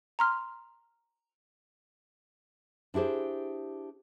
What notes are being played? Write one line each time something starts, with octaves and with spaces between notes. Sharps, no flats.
A#5 C6 F6
D4 E4 G4 G#4 C5